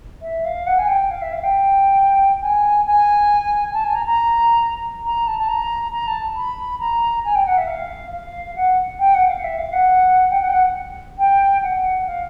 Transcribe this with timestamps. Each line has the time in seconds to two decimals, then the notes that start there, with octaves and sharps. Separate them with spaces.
0.22 E5
0.45 F5
0.66 F#5
0.78 G#5
0.88 G5
1.10 F5
1.21 E5
1.32 F5
1.43 G5
2.41 G#5
2.85 G#5
3.73 A5
3.84 G#5
3.94 A#5
4.06 A#5
5.04 A#5
5.27 A5
5.38 A5
5.48 A#5
5.92 A#5
6.07 A5
6.35 B5
6.79 A#5
7.24 G#5
7.35 G5
7.46 F#5
7.57 E5
7.67 F5
8.12 F5
8.56 F#5
8.99 G5
9.14 F#5
9.28 F5
9.43 E5
9.58 F5
9.72 F#5
10.30 G5
10.41 F#5
10.48 G5
10.52 F#5
11.18 G5
11.62 F#5
12.06 F5